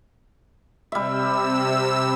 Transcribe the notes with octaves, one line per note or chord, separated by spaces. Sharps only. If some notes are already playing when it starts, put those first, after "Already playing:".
C3 G3 E5 E6